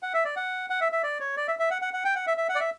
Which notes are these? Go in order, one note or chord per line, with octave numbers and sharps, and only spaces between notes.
F#5
E5
D5
F#5
F#5
E5
E5
D5
C#5
D5
E5
E5
F#5
F#5
F#5
G5
F#5
E5
E5
F#5
D5
E5